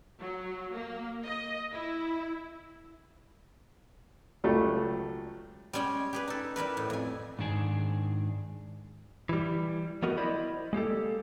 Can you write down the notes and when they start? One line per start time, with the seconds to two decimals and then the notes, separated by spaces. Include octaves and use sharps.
0.19 F#3
0.71 A#3
1.26 D#5
1.71 E4
4.44 C#2 F#3 G3 A3
5.73 G3 G#3 C#4 G#4 G5
6.13 G4 G#4 B4
6.28 D#4 A4
6.56 G3 E4 A#4 B4
6.77 A2
6.90 F2 G#5
7.39 G#2 D#3 D4 G#4
9.29 E3 G3
10.02 F3 G3 B3 F#4 A#4 D#5
10.17 E4 C5 D5 D#5 B5
10.73 G#3 A#3 G4 A4